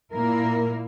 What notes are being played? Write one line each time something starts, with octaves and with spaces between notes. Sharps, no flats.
A#2 A#3 E4 A#4